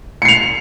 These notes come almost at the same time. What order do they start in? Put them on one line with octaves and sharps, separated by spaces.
C#7 C7 F7